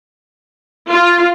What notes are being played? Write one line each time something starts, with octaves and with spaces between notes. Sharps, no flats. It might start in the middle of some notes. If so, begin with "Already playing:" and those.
F4